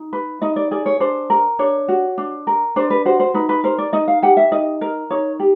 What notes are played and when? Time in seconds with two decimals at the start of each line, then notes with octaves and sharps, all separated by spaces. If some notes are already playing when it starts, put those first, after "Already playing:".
Already playing: D#4
0.13 B4
0.42 D#4 D#5
0.56 D5
0.71 G#4 D5
0.86 C#5
1.00 D4 C5
1.30 A#4
1.59 D4 C#5
1.88 F#4
2.18 D4
2.47 A#4
2.76 D4 C5
2.90 B4
3.05 F#4 C5
3.20 C5
3.34 D#4 B4
3.49 B4
3.64 A#4 C5
3.78 D5
3.93 D#4 D#5
4.08 F5
4.23 G4 F#5
4.37 E5
4.52 D#4 D#5
4.81 A#4
5.11 D#4 C#5
5.40 G4